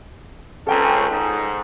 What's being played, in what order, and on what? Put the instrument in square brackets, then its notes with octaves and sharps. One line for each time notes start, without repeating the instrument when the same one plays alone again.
[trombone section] C#2 C4 C#4 [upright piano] A4 G5 A#5
[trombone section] G#2